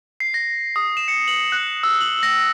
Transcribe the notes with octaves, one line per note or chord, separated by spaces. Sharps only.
C7
A#6
D#6
E7
C#7
F#7
F#6
E6
F#7
A#6